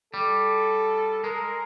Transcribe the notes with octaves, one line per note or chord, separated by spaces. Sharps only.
G3 A4
G#3 A#4